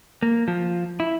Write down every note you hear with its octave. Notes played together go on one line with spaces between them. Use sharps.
A#3
F3
E4